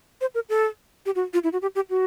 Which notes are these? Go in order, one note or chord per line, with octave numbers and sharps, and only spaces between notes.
C5
A#4
A4
G4
F#4
F4
E4
F#4
G4
G4
F#4